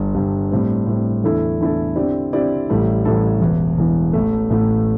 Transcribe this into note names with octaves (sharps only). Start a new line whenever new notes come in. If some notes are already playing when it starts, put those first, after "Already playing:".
Already playing: G1 G2 G3
G1 G2 G3
A2 G3 C4
A2 G3 C4
E2 D3 A3 E4 A4
E2 D3 A3 E4 A4
D3 C4 E4 G4 D5
D3 C4 E4 G4 D5
A1 A2 G3 E4 A4
A1 A2 G3 E4 A4
E1 E2 E3
E1 E2 E3
A1 A2 A3
A1 A2 A3